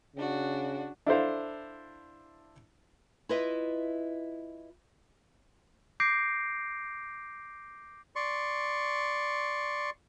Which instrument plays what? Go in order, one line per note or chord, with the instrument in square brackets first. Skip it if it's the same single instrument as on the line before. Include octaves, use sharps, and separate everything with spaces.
[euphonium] C#3 [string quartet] D4 F#4
[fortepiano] D4 E4 A4 C5 F5
[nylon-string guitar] E4 F4 B4 D#5 E5
[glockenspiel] D6 G6 A#6 C7 D7
[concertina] D5 C6 C#6